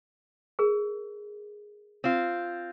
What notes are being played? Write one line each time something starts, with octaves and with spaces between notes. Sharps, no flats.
G#4 A#4
C4 F4